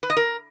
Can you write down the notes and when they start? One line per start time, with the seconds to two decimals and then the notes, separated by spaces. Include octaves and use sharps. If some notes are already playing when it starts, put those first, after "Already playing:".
0.03 B4
0.10 D#5
0.17 A#4